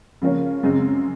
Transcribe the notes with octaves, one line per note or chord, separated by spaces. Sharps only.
C#3 F3 A#3 C#4
F#2 C#3 G#3 C4